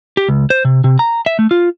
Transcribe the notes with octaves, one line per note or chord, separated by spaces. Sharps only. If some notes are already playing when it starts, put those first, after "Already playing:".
G4
C#2
C5
C3
C3
A#5
E5
A3
F4